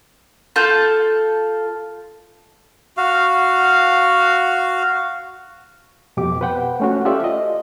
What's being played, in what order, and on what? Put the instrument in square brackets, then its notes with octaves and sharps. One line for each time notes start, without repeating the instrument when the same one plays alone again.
[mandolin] F4 A4 A5 G6
[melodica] F#4 F5
[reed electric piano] F2 B2 G4 D6
B4 C5 F#5 G5
A3 C#4 F#4
F4 G4 A4 C5 D5 E5
D#5